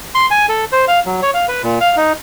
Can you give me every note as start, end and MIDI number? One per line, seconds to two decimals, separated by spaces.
0.15 0.26 84
0.31 0.46 80
0.49 0.65 69
0.72 0.85 72
0.88 1.00 77
1.06 1.21 54
1.22 1.31 73
1.34 1.46 77
1.48 1.62 71
1.63 1.79 46
1.81 1.96 77
1.97 2.13 63